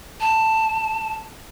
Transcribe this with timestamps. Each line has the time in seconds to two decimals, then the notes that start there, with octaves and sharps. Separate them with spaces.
0.21 A5